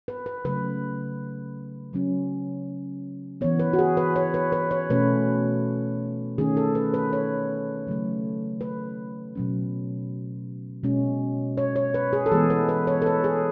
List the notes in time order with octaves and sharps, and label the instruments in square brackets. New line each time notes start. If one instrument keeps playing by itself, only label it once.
[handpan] B4
B4
C#3 F#3 A3 B4
C#3 F#3 C#4
E3 B3 C#5
B4
F#4
G#4
B4
C#5
B4
B4
C#5
B2 A3 C#4 B4
D#3 A3 C#4 G#4
A4
B4
B4
C#5
C#3 F#3 A3
B4
B2 F#3 C#4
B2 G#3 C#4
C#5
C#5
B4
G#4
A4
E3 G#3 B3 G#4
B4
B4
C#5
A4
B4
G#4